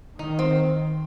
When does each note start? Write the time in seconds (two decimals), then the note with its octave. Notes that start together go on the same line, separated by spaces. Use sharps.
0.19 D#3 D#4
0.39 C4